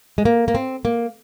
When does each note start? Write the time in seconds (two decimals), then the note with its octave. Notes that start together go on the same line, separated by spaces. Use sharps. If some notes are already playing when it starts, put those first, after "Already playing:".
0.18 G#3
0.25 A#3
0.48 A#3
0.55 C4
0.85 A#3